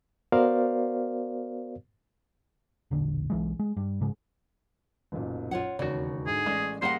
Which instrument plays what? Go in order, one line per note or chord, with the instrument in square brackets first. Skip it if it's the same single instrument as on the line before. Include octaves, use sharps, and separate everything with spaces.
[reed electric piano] B3 F#4 A#4 C5 D5 F5
[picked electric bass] E1 A#1 D3
B1 E3 G#3
G#3
G2
G#2 C#3 G#3
[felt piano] F#1 B1 A#2
[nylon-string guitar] F4 C#5 F#5
[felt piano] E1 D#2 [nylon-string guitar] C#3 [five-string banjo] F#4 D5
[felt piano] G#2 D3 [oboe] G#4
[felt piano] A1 D5 D#6 [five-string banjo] G#3 A3 [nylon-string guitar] F5
[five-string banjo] G3 A#3 G4 [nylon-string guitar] G#4 D#5 F#5 [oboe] C6